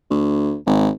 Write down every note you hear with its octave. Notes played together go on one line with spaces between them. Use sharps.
D2
G#1